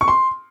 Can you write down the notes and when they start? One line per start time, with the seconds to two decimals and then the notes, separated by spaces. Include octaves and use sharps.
0.01 C#6
0.08 C6